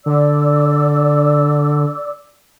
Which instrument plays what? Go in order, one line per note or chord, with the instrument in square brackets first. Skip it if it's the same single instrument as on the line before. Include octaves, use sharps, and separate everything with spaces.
[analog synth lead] D3 [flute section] D5 D6 E6